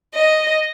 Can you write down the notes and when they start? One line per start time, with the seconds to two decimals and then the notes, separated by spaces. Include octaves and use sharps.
0.14 D#5